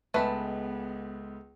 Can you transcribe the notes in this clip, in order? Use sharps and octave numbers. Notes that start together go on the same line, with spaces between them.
C#2 G#3 A3 B3 B4 A5 B5